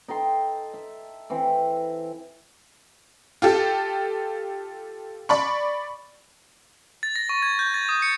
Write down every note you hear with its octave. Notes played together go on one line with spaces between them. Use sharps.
D#4 A4 G5 C6
E5
E3 C4
F4 G4 A4
D5 B5 C#6
A6
A#6
C#6
G#6
G6
A6
D#6
C#7